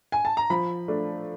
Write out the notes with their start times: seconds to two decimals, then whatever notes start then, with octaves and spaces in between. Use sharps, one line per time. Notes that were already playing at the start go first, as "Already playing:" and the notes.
0.12 G#5
0.25 A5
0.37 A#5
0.50 F3 B5
0.88 A3 D4